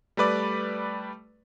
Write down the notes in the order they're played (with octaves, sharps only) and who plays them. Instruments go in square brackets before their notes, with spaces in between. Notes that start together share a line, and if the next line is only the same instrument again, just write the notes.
[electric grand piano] G3 A3 B4 D5